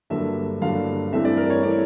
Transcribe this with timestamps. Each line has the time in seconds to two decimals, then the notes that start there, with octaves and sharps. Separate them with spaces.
0.10 G2 D3 F#3 A#3 D4 E5
0.62 G2 D3 F#3 A#3 D4 F5
1.13 G2 E3 A3 C4 E5
1.25 D5
1.37 A#4
1.50 C#5
1.63 E3 A3 C4 D5